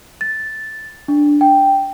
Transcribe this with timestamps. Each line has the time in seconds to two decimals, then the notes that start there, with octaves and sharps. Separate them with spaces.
0.21 A6
1.08 D4
1.41 G5